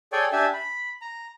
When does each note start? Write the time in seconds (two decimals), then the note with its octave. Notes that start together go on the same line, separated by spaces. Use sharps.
0.13 G#4 A4 C#5 D5 G5 G#5
0.33 D4 G4 E5 G#5 A5
0.53 B5
1.01 A#5